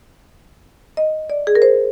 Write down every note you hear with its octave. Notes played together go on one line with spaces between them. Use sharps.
D#5
D5
G#4
A#4
C5